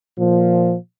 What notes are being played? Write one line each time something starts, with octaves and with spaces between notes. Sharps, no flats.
A#2 F3